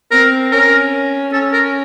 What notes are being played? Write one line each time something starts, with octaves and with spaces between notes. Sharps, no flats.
C4 A#4
C#4 A#4
C#4 A4
A#4